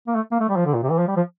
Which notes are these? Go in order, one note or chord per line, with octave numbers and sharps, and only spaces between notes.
A#3
A3
A#3
A3
G3
F3
D3
A#2
C3
E3
F3
G3
F3